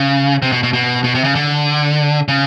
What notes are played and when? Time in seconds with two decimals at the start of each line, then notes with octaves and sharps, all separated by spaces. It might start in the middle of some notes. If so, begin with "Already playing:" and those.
Already playing: C#3
0.42 C3
0.52 B2
0.63 B2
0.73 B2
1.04 B2
1.15 C3
1.24 C#3
1.35 D3
2.28 C#3